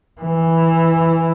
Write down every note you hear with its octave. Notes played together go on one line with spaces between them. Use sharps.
E3